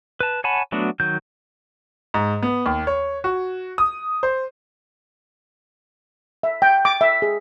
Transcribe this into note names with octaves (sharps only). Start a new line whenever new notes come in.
B4 A5
C#5 F#5 G#5 A5 B5
F#3 A3 B3 D4 F#4
D#3 F#3 G6
G#2
B3
D#2
C#5
F#4
D#6
C5
E5
G5
D6
E5
G#4